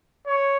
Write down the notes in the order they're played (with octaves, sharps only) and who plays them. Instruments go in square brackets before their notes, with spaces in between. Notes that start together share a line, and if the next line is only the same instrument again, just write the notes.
[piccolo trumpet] C#5